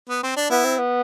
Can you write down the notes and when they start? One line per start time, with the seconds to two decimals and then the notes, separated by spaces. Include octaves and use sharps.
0.09 B3
0.23 C4
0.37 D4
0.50 B3 E4
0.64 C4
0.78 B3